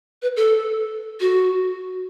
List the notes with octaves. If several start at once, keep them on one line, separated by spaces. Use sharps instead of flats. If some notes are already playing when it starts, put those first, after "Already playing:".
B4
A4
F#4